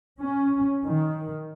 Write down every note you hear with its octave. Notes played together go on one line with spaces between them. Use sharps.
C#4
D#3